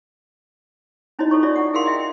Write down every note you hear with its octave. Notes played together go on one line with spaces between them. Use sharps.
C#4 D#4 E4 F#4 C#5 D#5
F4 A4 C#5 C#6
C#4 D4 F4 F#4 D5 E5
F#5
E4 G#4 A#4 F5 F#5 C6
D#5 E5 G5